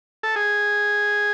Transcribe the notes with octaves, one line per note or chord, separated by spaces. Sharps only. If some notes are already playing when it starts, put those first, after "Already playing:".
A4
G#4